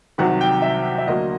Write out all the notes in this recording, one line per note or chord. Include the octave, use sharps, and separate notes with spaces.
C2 C3 D#3 F#3 F#5
G5
E5
E5
D2 D3 F#3 A#3 D#5